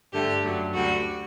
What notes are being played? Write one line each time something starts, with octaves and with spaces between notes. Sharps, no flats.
G2 D3 A3 G4
F#2 D3 F#3 A3
D2 D3 G3 F#4